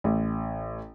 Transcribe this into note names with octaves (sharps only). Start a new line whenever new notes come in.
A1